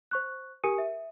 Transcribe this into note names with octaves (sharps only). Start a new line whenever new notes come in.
C5 C#6 F#6
G4 A#4 G#5 D#6 C#7 D#7
E5